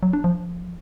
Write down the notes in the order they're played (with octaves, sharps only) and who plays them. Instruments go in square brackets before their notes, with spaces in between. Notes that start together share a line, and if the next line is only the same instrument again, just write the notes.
[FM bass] F#3
D4
F3